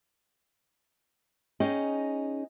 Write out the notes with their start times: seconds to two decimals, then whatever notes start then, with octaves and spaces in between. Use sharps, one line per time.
1.60 C#4 D#4 G#4 D#5 G5